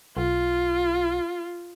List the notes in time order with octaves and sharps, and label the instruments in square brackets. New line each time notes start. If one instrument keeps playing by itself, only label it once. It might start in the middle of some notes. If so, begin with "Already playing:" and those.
[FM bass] B1 [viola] F4